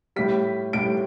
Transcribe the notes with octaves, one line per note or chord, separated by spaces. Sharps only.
A2 G3 B6
A2 G3 D7